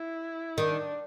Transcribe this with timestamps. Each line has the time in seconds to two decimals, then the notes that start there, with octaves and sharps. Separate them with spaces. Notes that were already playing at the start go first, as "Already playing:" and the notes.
Already playing: E4
0.58 D#3 D4